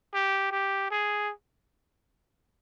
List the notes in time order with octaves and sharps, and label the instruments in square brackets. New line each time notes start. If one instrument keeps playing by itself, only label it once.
[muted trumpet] G4
G4
G#4